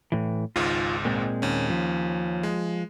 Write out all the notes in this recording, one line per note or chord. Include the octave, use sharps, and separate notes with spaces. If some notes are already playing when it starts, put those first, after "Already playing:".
A2 E3
G#1 C#2 G#2 F4
A#2 G#3 C4
D#2 C#4
F3
G#3